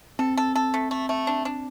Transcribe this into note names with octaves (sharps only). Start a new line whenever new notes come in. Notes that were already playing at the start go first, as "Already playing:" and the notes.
C4 A4
A4
A4
A3
A3
A3
D4
D4